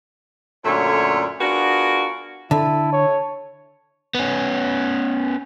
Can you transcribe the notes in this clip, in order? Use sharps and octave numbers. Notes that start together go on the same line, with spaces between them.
F#2 A#2 D3 A3 C#5 C6
B3 D4 F4 F#4 G#4 A#4
D3 E4 A5
C#5
B3 C#4